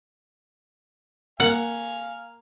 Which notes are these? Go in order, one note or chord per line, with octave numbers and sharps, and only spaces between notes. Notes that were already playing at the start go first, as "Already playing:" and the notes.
A#3 F5 F#5 G#5